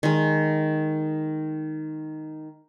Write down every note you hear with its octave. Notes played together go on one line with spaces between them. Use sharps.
D#3 G#3